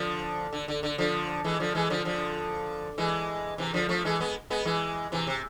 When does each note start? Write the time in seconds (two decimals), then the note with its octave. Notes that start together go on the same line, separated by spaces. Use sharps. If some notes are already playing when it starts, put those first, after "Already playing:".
Already playing: D3 F3
0.53 D3
0.68 D3
0.83 D3
0.98 D3 F3
1.44 E3 G#3
1.60 D3 F3
1.75 E3 G#3
1.90 D3 F3
2.05 D3 F3
2.98 E3 G#3
3.58 C3 E3
3.73 D3 F3
3.89 F3 A3
4.05 E3 G#3
4.20 G#3 B3
4.50 G#3 B3
4.65 E3 G#3
5.12 C3 E3
5.27 C3